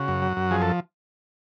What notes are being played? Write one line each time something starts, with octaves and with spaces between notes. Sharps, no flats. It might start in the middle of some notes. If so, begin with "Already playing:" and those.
Already playing: C#3 F#4
F#2
F#3
F#2
F3 G#4
A4